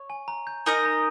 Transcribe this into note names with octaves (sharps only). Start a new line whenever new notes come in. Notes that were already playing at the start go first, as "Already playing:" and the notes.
Already playing: C#5
G#5
A#5
G6
D#4 A#4 D#5 G#5
A#5